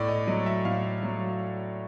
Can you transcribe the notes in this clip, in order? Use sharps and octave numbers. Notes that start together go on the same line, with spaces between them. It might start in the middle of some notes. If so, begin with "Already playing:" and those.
Already playing: A2 D5
D#5
F#3 D#5
E5
A2 F5
F#3